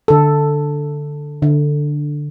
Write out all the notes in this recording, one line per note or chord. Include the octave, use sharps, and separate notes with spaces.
D3 A4
D3